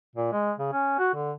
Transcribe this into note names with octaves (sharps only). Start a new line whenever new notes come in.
A#2
G#3
C#3
C#4
F#4
D3